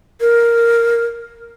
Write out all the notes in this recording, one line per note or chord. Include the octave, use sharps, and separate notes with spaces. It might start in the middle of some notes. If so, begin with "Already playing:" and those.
A#4